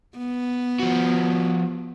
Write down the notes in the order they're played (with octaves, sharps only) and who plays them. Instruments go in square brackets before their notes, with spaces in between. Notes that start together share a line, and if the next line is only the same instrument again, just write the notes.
[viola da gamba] B3
[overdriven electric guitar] F3 F#4